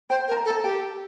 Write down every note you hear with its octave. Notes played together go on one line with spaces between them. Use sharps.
C5 G5
A#4
A5
A#5
A4
A5
G4 G5